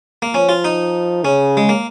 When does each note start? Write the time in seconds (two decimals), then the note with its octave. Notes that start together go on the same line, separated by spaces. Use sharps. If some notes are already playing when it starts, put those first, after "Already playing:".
0.22 A#3
0.34 F3 C#4
0.49 F4
0.64 D#4
1.24 C#3 C#4
1.57 G#3
1.69 A#3